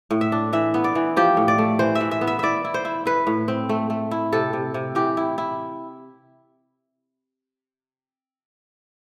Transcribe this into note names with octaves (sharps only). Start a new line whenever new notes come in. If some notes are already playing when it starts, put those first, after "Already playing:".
A2
E5
D4
E3 E5
B3
D5
E3
F3 G4
A2
D5
A3
E3 C5
E5
E3
E5
B3
E5
E4 D5 E5
E4
C5
E4
E4 B4
A2
C4
A3
A3
E4
C3 A4
C3
C3
E3 G4
E4
E4